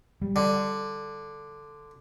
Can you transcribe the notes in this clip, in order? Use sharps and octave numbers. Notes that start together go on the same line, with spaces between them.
G3
D3